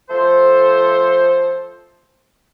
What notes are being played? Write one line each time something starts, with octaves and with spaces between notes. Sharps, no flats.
F3 A3 A4 C5